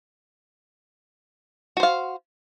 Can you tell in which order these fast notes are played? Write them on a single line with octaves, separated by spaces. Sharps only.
F#4 C5 F5